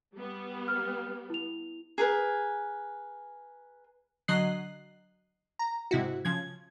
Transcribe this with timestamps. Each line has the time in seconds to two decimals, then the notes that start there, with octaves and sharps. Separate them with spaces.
0.14 G3 B3
0.68 F6
1.30 E4 F7
1.98 G#4 A#4 B4
4.28 D3 F#3 D#5 F#6 C7
5.59 A#5
5.91 G#2 C3 E4 F#4
6.25 C#3 F3 G#6